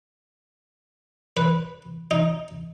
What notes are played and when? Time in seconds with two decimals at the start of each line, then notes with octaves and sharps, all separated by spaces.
1.37 B4
2.11 D#4